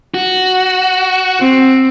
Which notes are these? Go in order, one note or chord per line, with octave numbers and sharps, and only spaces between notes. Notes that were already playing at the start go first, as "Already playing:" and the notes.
F#4
C4